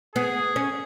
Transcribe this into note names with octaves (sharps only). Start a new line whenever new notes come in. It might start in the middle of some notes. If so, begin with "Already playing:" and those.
B3 G#4
C#4